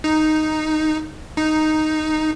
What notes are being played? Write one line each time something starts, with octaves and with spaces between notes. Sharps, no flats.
D#4
D#4